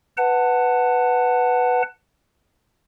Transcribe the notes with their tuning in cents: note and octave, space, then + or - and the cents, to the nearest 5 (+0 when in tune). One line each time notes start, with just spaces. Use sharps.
B4 +5 F#5 +0 A5 +20